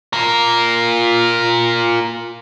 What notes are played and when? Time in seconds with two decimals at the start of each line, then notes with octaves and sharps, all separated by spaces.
0.13 F4 A#4